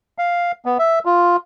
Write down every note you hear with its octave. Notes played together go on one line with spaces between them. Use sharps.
F5
B3
E5
F4